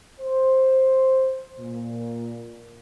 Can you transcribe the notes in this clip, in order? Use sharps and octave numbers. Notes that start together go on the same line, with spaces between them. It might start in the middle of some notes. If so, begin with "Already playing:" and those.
C5
A#2